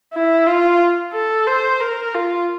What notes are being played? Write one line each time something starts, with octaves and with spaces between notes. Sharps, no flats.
E4
F4
A4
C5
A#4
F4